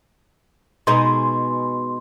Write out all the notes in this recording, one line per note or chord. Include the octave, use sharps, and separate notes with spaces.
B2 G#3 D#4 C6